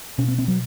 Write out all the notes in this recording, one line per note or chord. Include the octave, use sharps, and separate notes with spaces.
B2 C#4
C4
C4
F#3